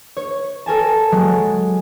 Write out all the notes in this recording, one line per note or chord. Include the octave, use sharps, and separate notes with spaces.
C#5
A4 A#4 G#5 A5
F#3 G#3